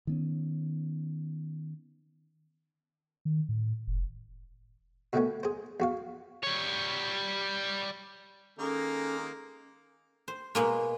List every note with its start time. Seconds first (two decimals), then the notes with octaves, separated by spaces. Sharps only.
0.07 D#3 B3 C#4
3.25 D#3
3.49 A2
3.87 F1
5.13 B2 D3 D#3 A3 B3 C#4
5.43 G#4 C5
5.80 E2 F#4 F5
6.43 G3 C#5
8.59 D#3 G#3 A#3 C#4 A4 A#5
10.28 C5
10.55 B2 G#3 A#3